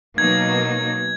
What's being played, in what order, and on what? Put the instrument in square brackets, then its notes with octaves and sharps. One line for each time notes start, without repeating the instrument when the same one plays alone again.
[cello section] B2 F#3 A#3 D#4 [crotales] G#6